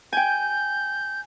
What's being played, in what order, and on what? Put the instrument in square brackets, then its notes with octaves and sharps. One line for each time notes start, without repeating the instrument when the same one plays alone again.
[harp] G5 G#5 [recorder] G6